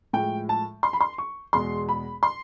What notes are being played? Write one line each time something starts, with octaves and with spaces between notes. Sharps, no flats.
A2 F3 G#3 G5
A5
C6
B5
C6
C#6
E2 B2 G#3 C6
B5
C6